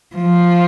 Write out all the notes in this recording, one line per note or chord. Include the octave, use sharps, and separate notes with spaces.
F3